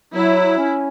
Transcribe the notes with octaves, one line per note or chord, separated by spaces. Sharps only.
F#3 E4
C#4